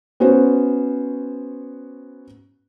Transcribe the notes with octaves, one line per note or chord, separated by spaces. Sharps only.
B3 C#4 F#4 C5